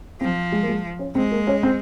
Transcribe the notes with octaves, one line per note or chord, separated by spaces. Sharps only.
F3 C4
G#3
A#3
G#3
C#4
G#3 C4
A#3
C#4
C4